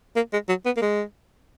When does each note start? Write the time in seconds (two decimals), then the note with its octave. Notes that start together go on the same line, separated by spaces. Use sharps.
0.16 A#3
0.33 G#3
0.49 F#3
0.66 B3
0.77 A#3
0.82 G#3